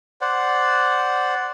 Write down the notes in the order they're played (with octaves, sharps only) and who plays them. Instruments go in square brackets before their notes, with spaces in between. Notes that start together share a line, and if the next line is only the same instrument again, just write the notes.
[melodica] C5 D5 F#5